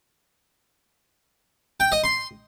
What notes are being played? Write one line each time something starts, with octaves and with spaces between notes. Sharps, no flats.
G5
D#5
C6